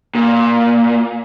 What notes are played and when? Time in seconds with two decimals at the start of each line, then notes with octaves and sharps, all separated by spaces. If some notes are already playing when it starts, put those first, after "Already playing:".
0.15 A#2